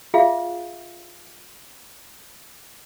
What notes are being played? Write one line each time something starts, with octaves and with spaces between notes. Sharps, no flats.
F4 G#4 E5 F5